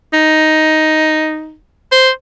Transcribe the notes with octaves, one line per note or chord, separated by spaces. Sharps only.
D#4
C5